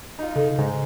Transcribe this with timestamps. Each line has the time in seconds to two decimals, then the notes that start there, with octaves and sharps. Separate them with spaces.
0.19 D#4 F4
0.36 C#3 A4
0.59 G#2 C#3